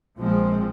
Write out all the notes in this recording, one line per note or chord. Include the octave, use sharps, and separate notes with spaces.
A#1 A#2 F3 G#3 C4